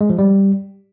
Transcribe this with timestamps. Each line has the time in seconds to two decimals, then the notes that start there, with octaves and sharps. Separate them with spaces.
0.01 G#3
0.10 F3
0.19 G3